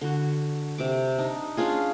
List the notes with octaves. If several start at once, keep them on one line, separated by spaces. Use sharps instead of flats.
D3 F#4
C3 D6
D4 D#4
C#4 D4 F4 G#4